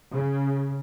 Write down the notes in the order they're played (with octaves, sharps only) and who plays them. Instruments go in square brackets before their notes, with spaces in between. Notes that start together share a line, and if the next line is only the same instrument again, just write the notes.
[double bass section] C#3